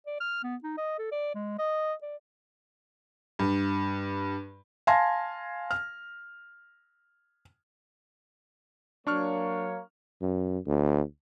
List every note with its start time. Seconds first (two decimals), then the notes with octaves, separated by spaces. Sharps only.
0.06 D5
0.20 F6
0.43 B3
0.63 D#4
0.78 D#5
0.99 A4
1.11 D5
1.34 G#3
1.59 D#5
2.02 D5
3.39 G2
4.87 F5 G#5 A5 C6 G#6 A#6
5.71 F6
9.07 F#3 A#3 D4 C#5 C#6 F6
10.22 F#2
10.67 D2